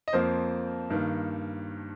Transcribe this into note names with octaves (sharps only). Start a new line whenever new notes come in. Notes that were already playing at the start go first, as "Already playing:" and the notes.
D#5
F2 F3 A#3 C5
G2 D#3 A#3